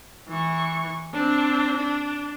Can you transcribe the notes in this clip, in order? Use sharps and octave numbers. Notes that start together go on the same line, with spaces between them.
E3 C#6
C4 D4
D4